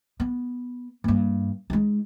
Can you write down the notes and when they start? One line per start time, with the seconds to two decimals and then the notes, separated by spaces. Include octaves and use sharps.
0.20 B3
1.04 G2 A#3
1.70 G#3 D#4